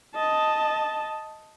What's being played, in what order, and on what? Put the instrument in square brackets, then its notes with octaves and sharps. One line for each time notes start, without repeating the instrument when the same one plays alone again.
[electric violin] D#5 A5